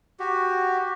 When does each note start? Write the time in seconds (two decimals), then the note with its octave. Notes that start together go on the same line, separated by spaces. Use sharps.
0.20 F#4 G4